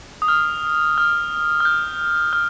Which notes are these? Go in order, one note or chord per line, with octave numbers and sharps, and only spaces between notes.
D#6
F6
F6
F6
G6
F6